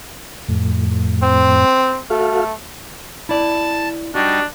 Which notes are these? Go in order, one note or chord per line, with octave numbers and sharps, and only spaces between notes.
F2 A2
C4
A3 F#4 A4 F5
E4 D5 A5
G3 D4 D#4 F#4